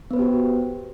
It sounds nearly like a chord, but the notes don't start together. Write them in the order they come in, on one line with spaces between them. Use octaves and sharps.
B3 B4 C5 G4 F#4